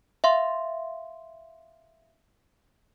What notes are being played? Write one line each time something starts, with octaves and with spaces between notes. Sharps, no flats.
E5 F5 C6